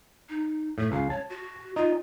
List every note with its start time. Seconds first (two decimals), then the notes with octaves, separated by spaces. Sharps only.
0.29 D#4
0.78 A2 A3
0.92 C#2 F5
1.10 C#5 A5
1.29 F#4
1.76 D#4 F4